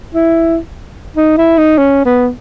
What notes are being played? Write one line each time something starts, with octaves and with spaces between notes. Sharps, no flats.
E4
D#4
E4
D#4
C#4
B3